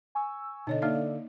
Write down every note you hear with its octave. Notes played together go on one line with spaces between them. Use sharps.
G#5 C#6 E6
B2 D3 D#4 C#5 D#5
A#3 D#4 D5 E5 F5